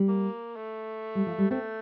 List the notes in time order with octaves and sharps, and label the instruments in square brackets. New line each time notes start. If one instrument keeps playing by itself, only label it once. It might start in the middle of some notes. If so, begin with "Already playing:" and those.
Already playing: [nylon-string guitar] G3
[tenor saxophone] A#3
A3
[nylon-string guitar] G3
F3
G3
[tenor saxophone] A3 [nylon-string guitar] C4